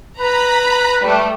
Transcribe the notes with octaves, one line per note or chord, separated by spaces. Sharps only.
B4 A#5 B5
G3 A3